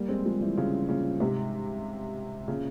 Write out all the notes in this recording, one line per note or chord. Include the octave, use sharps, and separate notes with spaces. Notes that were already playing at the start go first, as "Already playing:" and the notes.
Already playing: G3 A#3
G#3 C4
F3 G#3
E3 G3
C#3 F3
A#2 C#3
G#2 C3
A#2 C#3